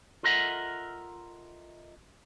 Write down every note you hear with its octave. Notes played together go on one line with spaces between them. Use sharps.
F4 A4 A#4 D#5 E5 F#5